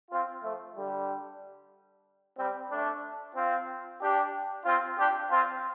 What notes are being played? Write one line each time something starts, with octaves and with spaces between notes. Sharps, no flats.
C4 F4
F3 A3
D3 G3
G3 C4
A3 D4
C4 F4
D4 G4
C4 F4
D4 G4
C4 F4